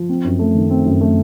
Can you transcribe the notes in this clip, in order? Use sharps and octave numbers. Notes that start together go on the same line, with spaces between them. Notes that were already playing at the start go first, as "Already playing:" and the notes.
Already playing: F3
C4
F#2
A3
D#3
C4
F#2
A3